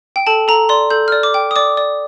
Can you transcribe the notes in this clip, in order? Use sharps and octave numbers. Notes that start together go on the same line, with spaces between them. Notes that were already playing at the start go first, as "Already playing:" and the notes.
G5
A4 A5
A4 A#5
D5 C6
A4 G6
F6
D5
D6
G5
D#6
D5 D6
D5